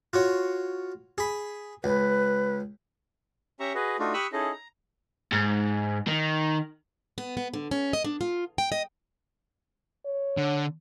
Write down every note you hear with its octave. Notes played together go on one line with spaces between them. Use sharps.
F4 F#4 C#5
G#4 B5
C#2 B4
C#4 G4 E5 A#5 C#6
F#4 G#4 B4 D#5
A3 D4 D#4 F4 F#4
G4 B5 C#6 D#6 E6 F#6
C#4 D#4 E4 G#4 A4 D#5
A#5
G#2
D#3
B3
B3
D3
C#4
D#5
D4
F4
G5
D#5
C#5
D3